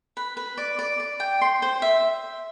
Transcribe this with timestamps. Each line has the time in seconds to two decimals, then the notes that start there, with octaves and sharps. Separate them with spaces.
0.17 B4
0.37 B4
0.57 D5
0.79 D5
1.00 D5
1.20 G5
1.41 C6
1.62 C5
1.82 E5